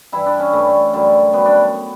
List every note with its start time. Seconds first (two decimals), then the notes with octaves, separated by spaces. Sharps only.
0.12 G2 E3 G3 E4
0.26 D4
0.39 C#4
0.52 G2 E3 G3 A3
0.68 A3
0.93 F#2 D3 G3
1.33 F#2 D3 G3 B3
1.45 D4